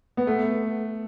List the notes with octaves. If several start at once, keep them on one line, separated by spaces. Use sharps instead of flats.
B3
A3